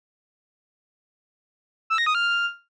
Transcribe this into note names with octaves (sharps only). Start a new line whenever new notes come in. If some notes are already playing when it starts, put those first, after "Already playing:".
E6
A#6
D#6
F6